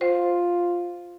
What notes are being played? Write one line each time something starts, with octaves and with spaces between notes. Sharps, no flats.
F4 C5